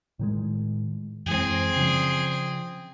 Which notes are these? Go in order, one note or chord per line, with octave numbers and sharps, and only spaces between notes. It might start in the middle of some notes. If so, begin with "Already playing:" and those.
A2 D#3 G#3
F#2 E3 G#3 C4 G#4
C#3 F3 D4